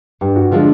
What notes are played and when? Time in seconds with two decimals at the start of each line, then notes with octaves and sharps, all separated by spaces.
0.21 G2 G4
0.36 F#4
0.51 D3 F3 G#3 F4